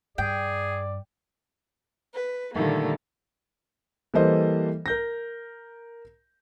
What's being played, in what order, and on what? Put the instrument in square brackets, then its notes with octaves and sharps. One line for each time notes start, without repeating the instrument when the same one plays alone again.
[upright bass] G2 [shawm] G#4 [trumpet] D5 [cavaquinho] G5
[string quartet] B4
A#2 D3 D#3 G3 A3 A#3
[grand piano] E3 G3 A#3 A4 C5 D#5
A#4 G6 A#6